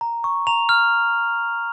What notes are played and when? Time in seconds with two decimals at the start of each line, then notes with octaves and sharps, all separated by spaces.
0.01 A#5
0.24 C#6
0.47 A#5 F7
0.69 F6